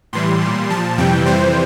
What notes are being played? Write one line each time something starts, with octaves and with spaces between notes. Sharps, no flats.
A2 E3 G3 C6
A#2 G3
A#2 F3 A5
F2 C3 E3 G3 G5
F2 C3 E3 G3 C5